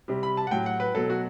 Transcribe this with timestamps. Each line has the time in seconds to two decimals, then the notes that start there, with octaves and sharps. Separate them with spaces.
0.08 C3 G3
0.23 B5
0.37 A5
0.47 F#5
0.51 A2 F#3 G5
0.66 F#5
0.80 B4
0.95 B2 F#3 A4
1.10 F#4